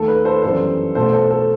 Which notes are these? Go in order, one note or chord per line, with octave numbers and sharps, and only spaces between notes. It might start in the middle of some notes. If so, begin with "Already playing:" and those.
Already playing: D#2 D#3 A3 A4
B4
A4 C5
G1 F#2 E3 G3 A4 C5
B1 B2 A3 A4 C5
A4 C5
A4